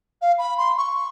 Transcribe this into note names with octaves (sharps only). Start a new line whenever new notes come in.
F5
B5
C6
C#6